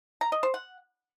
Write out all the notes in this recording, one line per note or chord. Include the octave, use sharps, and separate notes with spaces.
A#5
D#5
C5
F#5